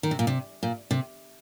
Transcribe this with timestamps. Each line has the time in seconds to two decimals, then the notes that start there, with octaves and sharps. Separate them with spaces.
0.03 D#3
0.11 C3
0.19 A#2
0.27 C3
0.63 A#2
0.91 C3